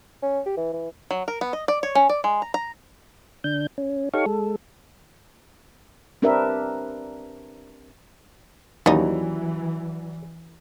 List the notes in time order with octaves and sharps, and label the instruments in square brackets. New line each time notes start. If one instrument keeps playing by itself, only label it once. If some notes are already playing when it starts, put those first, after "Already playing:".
[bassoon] C#4
G4
E3
E3
[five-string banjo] F#3
A#4
B3
D#5
D5
C#5
C#4
D5
G#3
A#5
A#5
[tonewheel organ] D3 D4 G6
C#4
D#4 G4 A4 C#5 F5 C#6
G#3 A4
[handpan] C4 D4 G4 A#4 B4 E5
[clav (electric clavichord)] D#2 [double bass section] E3 [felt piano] F#3 E4 D5 [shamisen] G3 C#4 D#4